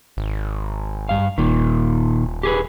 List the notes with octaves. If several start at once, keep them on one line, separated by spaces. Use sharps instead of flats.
G#1
G2 F5
D#1 A#2 D#3
G4 G#4 B4